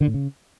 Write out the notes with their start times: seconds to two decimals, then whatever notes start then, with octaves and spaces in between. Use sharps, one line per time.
0.01 D3
0.07 A2
0.14 C#3